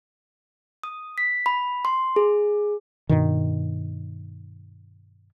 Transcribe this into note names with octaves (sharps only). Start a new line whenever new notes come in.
D#6
B6
B5
C6
G#4
G2 B2 D#3